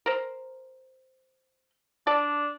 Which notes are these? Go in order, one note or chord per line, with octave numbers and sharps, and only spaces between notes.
A#4 C5
D4 D5 A5